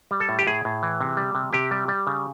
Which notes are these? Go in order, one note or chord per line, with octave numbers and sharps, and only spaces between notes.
G3
A4
A2
G4
A2 G#4
A2
E3
C3
G3
C3
C3 G4
G3
G3
C#3